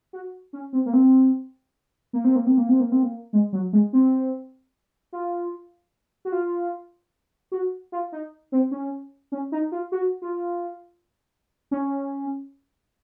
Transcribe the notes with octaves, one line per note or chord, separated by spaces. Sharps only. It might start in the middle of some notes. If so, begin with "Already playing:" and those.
F#4
C#4
C4
A#3
C4
A#3
C4
A#3
C4
A#3
C4
A#3
C4
A#3
G#3
F#3
G#3
C4
F4
F#4
F4
F#4
F4
D#4
C4
C#4
C#4
D#4
F4
F#4
F4
C#4